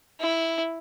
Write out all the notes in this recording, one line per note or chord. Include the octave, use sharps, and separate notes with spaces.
E4